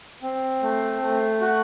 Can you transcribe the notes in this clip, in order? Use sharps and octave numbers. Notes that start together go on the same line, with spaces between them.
C4
A3
A3
F#4